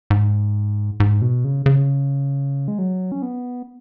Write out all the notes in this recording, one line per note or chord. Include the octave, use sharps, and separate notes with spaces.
G#2
G#2
B2
C#3
C#3
G#3
F#3
C#4
B3